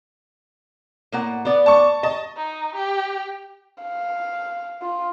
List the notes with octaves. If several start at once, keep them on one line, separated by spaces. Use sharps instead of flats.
A2 A#3 F#5
B3 D5
A5 C#6
D#5 A5
D#4
G4
F5
F4